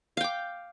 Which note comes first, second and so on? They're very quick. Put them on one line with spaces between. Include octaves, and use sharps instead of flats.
F5 G5 D6